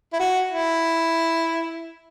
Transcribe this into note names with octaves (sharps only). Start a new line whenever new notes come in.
E4
F#4
E4